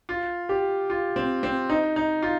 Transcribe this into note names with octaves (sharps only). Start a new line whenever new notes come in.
F4
G4
F4
C4
C4
D#4
D#4
F4